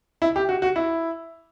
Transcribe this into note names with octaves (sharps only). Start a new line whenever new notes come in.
E4
G4
F#4
F#4
E4